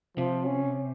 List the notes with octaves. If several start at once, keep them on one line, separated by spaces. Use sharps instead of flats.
C3 F3
C#4